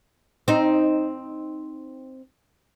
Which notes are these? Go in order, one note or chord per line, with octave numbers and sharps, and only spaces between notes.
C4 D#4